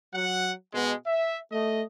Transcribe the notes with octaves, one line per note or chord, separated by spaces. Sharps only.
F#3 F#5
B2 G#3
E5
A3 D#5